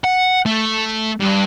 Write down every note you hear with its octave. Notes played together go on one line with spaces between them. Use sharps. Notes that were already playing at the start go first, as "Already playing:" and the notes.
F#5
A3
G2